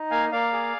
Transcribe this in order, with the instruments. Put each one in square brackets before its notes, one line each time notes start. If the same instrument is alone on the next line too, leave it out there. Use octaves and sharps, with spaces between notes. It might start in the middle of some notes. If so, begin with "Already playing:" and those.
Already playing: [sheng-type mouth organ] D#4
A#3 F5 G#5
A#3 D5 F5
G#4